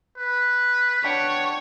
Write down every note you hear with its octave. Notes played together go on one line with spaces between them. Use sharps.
B4
D4 C#5 F#5 G5